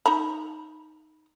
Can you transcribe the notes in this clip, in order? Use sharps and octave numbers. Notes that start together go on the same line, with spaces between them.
D#4 A#5 B5